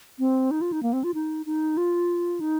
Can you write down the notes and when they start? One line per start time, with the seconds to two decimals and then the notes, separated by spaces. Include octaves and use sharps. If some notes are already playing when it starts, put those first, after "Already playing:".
0.19 C4
0.51 D#4
0.61 F4
0.72 D#4
0.83 A#3
0.93 C4
1.04 F4
1.14 D#4
1.46 D#4
1.77 F4
2.40 D#4